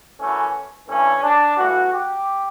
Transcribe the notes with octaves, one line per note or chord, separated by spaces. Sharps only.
F#2 E3 A3 C#4
G2 E3 A3 C#4
D4
G2 E3 A3 F#4
G4